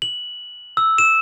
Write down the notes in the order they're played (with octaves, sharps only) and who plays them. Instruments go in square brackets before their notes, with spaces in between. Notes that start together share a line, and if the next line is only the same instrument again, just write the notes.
[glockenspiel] F#7
E6
E7